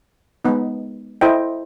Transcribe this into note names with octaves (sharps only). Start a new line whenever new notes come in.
G#3 B3 D#4
E4 A4 C5 D#5 G5